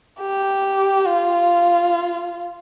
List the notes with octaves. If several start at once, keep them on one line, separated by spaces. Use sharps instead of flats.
G4
F4